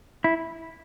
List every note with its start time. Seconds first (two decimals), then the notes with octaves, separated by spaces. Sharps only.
0.24 E4